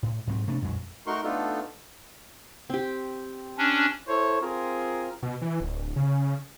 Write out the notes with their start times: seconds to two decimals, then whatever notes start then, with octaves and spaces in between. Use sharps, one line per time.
0.03 A2
0.27 G#2 F#3 C4
0.48 C3 A3 B3 D4
0.62 A#1 F2 F#3 G#3
1.07 A3 D#4 F#4 A#4 C6 C#6
1.24 A3 B3 D4 D#4 F4 A4
2.70 C4 G4
3.58 C#4 D4
4.08 E4 A4 C5 C#5
4.41 C4 F4 G#4 A#4
5.23 B2
5.42 E3
5.60 D1
5.96 C#3